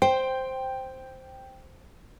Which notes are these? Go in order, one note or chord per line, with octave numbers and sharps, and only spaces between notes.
C5 G5